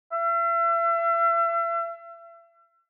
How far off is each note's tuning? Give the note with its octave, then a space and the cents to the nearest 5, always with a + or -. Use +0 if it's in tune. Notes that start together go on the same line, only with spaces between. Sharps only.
E5 +40